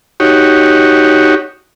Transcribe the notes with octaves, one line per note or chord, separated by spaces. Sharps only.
D#4 F#4 G4 C#5